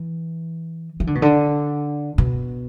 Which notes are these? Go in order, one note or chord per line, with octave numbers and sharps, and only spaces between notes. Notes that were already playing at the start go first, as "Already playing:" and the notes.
Already playing: E3
E3
D3
B2
D3
B2